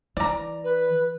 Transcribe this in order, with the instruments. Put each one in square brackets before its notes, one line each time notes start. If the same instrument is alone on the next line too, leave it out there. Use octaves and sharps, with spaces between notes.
[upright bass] E3 [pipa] D5 A#5
[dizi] B4